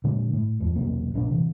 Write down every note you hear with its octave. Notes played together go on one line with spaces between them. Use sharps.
A#2 D3 G#3
A2
D1 A1 E2 F3
E1 B1 C3 A#3
B1 A#2 C4 D4
C3 E3